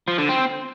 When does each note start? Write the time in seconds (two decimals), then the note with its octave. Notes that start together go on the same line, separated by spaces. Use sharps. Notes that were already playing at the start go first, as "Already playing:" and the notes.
0.08 F3
0.18 D3
0.29 C4